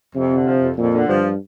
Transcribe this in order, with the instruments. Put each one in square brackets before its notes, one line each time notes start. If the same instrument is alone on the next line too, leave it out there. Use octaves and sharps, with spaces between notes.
[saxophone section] F2 [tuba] C3
[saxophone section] D3
F3
F2
[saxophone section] F2 [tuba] A#2
[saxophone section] D3
[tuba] G2 [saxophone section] F3